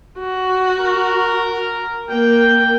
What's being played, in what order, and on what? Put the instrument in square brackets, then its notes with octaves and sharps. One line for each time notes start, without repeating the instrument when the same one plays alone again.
[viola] F#4
[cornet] A#4
[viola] A#3 [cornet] G5